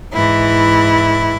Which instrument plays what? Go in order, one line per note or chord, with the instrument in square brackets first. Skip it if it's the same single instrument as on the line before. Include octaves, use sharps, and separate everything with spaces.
[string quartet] G#2 E3 E4